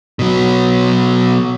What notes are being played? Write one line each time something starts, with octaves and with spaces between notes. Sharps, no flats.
B2 F#3